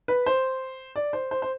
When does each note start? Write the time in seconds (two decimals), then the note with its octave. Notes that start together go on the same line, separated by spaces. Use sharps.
0.08 B4
0.26 C5
0.96 D5
1.13 C5
1.31 C5
1.42 C5